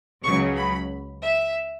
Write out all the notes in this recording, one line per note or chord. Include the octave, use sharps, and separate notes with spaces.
C#2 C#3 F#3 C#6
B5
E5